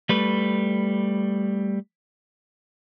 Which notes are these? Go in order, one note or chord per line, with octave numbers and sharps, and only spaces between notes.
G3 A3 B4